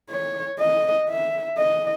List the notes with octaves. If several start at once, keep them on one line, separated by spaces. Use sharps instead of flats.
C#5
D#5
E5
D#5